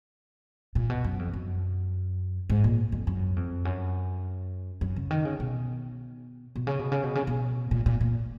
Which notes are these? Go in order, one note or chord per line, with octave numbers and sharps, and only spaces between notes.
A#2
B2
F#2
F2
F#2
G#2
A#2
F2
F#2
F2
F#2
F#2
C#3
D#3
C#3
B2
B2
C#3
B2
C#3
B2
C#3
B2
A#2
A#2
A#2